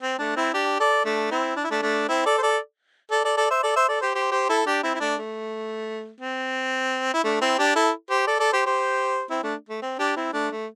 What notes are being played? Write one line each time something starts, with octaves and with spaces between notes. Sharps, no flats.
C4
A3 D4
C4 E4
D4 G4
A4 D5
A3 D4
C4 E4
D4
E4
A3 D4
A3 D4
C4 E4
A4 D5
C5
A4 D5
A4 D5
A4 D5
A4 D5
C5 E5
A4 D5
C5 E5
A4 D5
G4 C5
G4 C5
G4 C5
E4 A4
D4 G4
C4 E4
E4
A3 D4
A3
C4
E4
A3 D4
C4 E4
D4 G4
E4 A4
G4 C5
A4 D5
A4 D5
G4 C5
G4 C5
C4 E4
A3 D4
A3
C4
D4 G4
C4 E4
A3 D4
A3